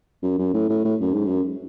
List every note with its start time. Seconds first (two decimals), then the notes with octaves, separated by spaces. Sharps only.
0.22 F#2
0.38 F#2
0.54 A2
0.69 A2
0.84 A2
1.00 F#2
1.13 G#2
1.27 F#2